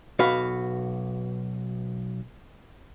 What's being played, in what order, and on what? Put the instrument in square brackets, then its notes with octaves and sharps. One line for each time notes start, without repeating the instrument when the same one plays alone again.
[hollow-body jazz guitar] B1 F#4 B4 F5